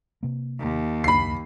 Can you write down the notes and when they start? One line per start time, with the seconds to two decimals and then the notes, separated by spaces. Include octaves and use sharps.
0.23 C3 A#3
0.61 D#2
1.04 C#2 F#2 B5 C7